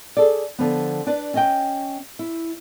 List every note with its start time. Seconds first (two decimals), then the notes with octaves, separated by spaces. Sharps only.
0.17 G#4 A4 D5
0.58 D3 F3 B3
1.07 D4 B4 D5
1.34 C#4 D#5 G5
2.19 E4